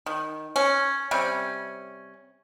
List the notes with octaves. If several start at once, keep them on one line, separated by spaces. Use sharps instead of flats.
D#3
C#4
C3 G3 C#4